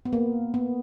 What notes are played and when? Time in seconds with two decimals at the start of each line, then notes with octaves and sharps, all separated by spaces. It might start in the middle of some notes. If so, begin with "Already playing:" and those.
0.05 B3
0.13 A#3
0.54 B3